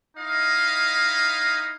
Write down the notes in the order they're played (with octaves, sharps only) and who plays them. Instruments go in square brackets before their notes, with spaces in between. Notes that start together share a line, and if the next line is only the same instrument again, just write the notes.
[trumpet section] D#4 E4 D#5 F5